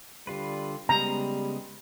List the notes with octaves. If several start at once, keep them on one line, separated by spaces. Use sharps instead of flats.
D3 G3 F4 B4
C#3 G3 G#3 B3 A#5